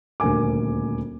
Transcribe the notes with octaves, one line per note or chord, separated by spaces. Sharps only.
D#1 D2 A#4 G#5 D6